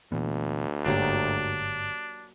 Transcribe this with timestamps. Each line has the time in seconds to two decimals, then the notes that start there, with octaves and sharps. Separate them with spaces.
0.12 D2 A#2 E3 B3
0.86 G1 G#2 D3 F#3 A#3 D4 G4